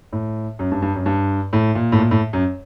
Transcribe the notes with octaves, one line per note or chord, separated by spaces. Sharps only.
A2
F#2
G2
G2
F#2
G2
A2
A#2
A2
A#2
A2
F#2